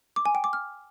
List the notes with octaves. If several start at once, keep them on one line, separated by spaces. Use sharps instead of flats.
D6
G#5
G5
D6
F6